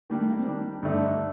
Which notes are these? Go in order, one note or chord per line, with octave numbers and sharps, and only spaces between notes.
D#3 G3 A#3 D4
A3
A#3
C4
D#3 G3 D4
G2 D3 A3 D4 D#4